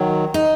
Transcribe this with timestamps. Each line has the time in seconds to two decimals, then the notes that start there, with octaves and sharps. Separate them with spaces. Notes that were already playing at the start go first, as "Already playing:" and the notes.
Already playing: D#3 F#3
0.34 D#4